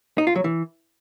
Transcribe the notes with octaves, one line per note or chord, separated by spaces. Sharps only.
D#4
F4
F#3
E3